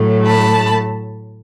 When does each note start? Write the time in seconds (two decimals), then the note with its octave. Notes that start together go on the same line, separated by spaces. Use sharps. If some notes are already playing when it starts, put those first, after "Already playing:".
Already playing: A2 F#3 A3
0.26 A5 B5